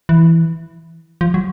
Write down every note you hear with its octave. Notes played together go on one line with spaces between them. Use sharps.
E3
F3
F#3